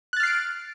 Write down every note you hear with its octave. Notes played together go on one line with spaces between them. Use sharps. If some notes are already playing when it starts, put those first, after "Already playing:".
F6 F#6 A6 C7 D7